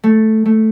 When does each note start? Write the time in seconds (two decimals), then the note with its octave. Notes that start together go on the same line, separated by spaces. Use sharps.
0.04 A3
0.46 A3